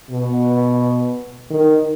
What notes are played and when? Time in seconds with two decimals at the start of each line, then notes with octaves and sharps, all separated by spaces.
0.10 B2
1.50 D#3